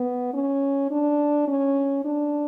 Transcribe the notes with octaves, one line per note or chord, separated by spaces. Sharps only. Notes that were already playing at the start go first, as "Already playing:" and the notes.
Already playing: B3
C#4
D4
C#4
D4